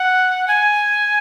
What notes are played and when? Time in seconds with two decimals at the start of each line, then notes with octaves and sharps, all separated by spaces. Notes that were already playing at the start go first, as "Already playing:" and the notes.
Already playing: F#5
0.48 G#5